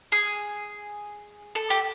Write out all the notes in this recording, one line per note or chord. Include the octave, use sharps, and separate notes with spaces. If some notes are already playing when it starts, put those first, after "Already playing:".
G#4
A4
G4